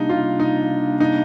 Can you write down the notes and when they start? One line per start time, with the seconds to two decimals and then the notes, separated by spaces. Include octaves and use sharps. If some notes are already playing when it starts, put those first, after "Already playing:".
Already playing: C3 G3 A#3 D4 D#4
0.09 F4
0.40 D#4
1.00 D#4